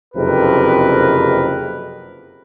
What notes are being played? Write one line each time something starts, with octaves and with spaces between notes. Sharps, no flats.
F#1 F2 C3 G#4 A#4 B4